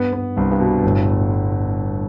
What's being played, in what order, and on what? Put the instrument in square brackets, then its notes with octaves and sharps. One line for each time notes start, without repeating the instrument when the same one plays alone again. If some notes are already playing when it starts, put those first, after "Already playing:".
Already playing: [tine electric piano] G2 [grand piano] B3
[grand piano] B3
[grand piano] C2 [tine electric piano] G2
[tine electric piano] G2
[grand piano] B2
[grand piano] G1 [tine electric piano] A2